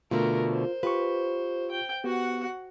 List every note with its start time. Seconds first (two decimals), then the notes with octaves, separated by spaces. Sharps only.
0.11 B2 D3 A3 F4 A#4
0.51 C5
0.83 F4 G4 B4 C#6
1.71 G5
2.04 B3 F#4 G4 F#5